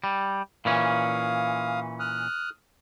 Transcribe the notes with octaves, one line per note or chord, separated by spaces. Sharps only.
G3
A#2 E3 C#4 F5 D#6
D#6 F6 F#6